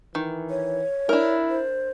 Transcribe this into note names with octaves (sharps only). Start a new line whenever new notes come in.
D#3 E3
C#5
D4 E4 A#4
C5